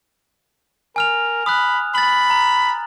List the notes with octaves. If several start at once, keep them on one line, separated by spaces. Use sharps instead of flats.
A#4 G#5 F6 F7
B5 D#6 F#6
B5 A6 F#7
A#5